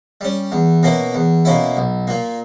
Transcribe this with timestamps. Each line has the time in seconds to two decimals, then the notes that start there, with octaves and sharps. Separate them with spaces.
0.21 G3 C#4
0.52 E2
0.83 B2 A#3 C#4 E4
1.14 E2
1.45 B2 A#3 C#4 E4
1.77 B1
2.07 A#2 A#3